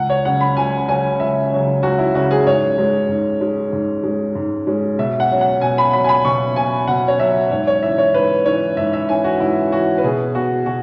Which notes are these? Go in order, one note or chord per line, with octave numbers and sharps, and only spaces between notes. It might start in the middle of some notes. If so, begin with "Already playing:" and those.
Already playing: C#2 F#5
C#5
C#3 F#3 C#4 F#5
B5
C#2 G#5
C#3 F#3 C#4 G#5
C#2 E5
C#3 F#3 C#4
C#2 F#4
E4
C#3 F#3 C#4 F#4
G#4
G#2 C#5
G#3 C#4
G#2
G#3 C#4
G#2
G#3 C#4
G#2
G#3 C#4
B2 E5
F#5
F#3 C#4
F#5
B2 G#5
B5
F#3 C#4 B5
G#5
B5
B2 C#6
F#3 C#4 G#5
B2 F#5
C#5
F#3 C#4 E5
G#2 C#5
C#5
E3 C#4 E5
C#5
G#2 B4
E3 C#4 C#5
G#2 E5
E5
E3 C#4 G#5
F#4
G#2 E4
E3 C#4 F#4
B4
B2 G#4
B3 F#4
B2 F#4